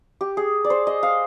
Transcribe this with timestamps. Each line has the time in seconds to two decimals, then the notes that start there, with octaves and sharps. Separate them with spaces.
0.21 G4
0.37 G#4
0.64 D5
0.70 C5
0.87 D#5
1.03 F5